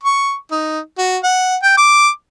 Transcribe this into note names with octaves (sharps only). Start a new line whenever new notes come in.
C#6
D#4
F#4
F#5
G5
D6